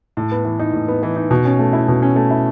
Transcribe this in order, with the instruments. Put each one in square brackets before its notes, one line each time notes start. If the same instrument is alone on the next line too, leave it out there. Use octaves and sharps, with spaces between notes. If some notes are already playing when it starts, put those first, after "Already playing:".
[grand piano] A2
B3
E3
D#4
A2
B3
E3
D#4
B2
C#4
A3
E4
B2
C#4
A3
E4